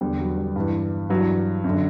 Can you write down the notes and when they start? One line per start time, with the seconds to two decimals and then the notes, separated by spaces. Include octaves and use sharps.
0.01 E2 D3 G3
0.19 F#3
0.38 G3
0.56 G2 E3
1.10 G2 E3 F#3
1.64 F#2 D3